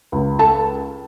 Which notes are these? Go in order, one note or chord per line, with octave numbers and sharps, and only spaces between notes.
C#2
A4 A5